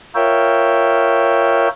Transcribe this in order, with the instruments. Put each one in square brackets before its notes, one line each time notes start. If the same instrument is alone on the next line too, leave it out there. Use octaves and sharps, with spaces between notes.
[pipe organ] F4 A#4 C#5 E5 G5